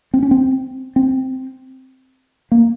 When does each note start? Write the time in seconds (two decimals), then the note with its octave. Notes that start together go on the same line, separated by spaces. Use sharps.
0.14 C4
0.23 C#4
0.31 C4
0.96 C4
2.52 A#3